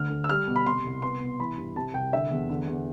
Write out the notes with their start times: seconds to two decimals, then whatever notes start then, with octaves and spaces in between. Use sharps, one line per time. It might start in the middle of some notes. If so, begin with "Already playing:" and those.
Already playing: D2 D3 F6
0.10 D2
0.24 E6
0.29 G3 F6
0.47 B2
0.56 B5
0.66 C3 C6
0.85 C2
1.02 B3 C6
1.21 B2
1.40 E3 B5
1.58 G2
1.76 C3 A5
1.94 C2 G5
2.13 D3 E5
2.31 E2
2.49 D3
2.67 E2